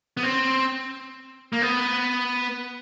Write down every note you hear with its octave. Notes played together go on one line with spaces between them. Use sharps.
B3
C4
A#3
B3